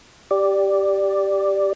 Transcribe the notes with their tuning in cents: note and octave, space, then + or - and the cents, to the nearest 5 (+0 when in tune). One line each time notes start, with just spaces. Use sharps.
G4 +0 D5 +0